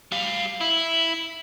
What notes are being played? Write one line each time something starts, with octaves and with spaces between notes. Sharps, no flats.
G3 F5
E4